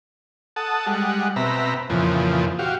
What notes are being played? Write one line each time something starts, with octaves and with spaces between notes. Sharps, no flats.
A4 F#5 A5 D#6
G3 G#3 F#5
B2 C4 E5 A#5 B5
F2 A#2 C#3 E3 F3
F#4 G4 F5